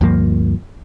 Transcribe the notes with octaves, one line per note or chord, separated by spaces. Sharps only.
D2 G2 F3 A#3